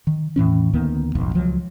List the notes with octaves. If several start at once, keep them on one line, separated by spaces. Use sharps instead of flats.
D#3
E2 A2 E3 C#4
D2 D#3 A#3 B3
D1 B1 F2
C#2 F3 F#3